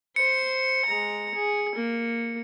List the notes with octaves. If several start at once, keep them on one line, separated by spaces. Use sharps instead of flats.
C5 C#7
G#3 A#5
G#4
A#3